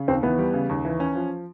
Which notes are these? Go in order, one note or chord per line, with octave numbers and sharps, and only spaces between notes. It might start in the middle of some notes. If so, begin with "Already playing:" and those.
Already playing: C#3
D#2 C4
E3 B3
G3
C#3
D#2
E3
C#4
F3